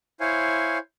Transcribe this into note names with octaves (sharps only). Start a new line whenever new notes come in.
E4 C5 C#5 F5 G#5